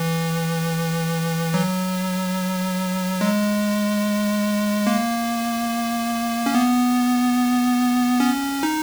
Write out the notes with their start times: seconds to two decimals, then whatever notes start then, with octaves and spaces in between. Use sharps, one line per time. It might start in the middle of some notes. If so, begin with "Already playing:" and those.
Already playing: E3
1.54 F#3
3.21 G#3
4.87 A#3
6.46 C#4
6.55 B3
8.20 C#4
8.63 D#4